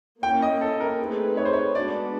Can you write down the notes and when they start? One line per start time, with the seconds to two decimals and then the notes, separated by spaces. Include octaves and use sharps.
0.23 A#3 C#4 E4 G5
0.42 D#5
0.61 A4
0.80 A#4
0.99 A3 C4 D#4 G#4 B4
1.37 C#5
1.45 C5
1.53 C#5
1.75 G#3 B3 D4 F#4 D5